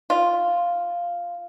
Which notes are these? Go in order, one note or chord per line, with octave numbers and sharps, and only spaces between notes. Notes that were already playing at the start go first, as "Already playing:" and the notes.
F4